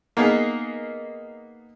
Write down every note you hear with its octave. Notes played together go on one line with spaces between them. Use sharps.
A#3 B3 D#4 G#4 A#4